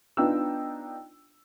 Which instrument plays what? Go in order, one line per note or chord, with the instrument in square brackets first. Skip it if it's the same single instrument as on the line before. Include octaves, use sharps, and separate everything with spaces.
[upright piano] B3 D4 D#4 F4 G5 E6